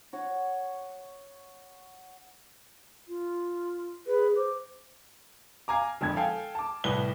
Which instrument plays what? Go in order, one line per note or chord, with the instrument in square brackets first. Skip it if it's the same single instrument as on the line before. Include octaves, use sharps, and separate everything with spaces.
[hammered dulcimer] F#4 C#5 F#5
[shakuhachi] F4
[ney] G#4 [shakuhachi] B4
[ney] C5 [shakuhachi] D6
[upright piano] F5 G#5 A#5 D6
E1 F2 D3 G#6
A4 F5 G5 G#5
A5 D6
C2 A2 B4 G7